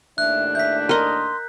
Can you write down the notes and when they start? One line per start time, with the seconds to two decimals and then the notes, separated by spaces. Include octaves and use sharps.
0.18 D#2 A2 D4 E5 F#6
0.55 E5 G6 B6
0.89 A#4 D#5 C6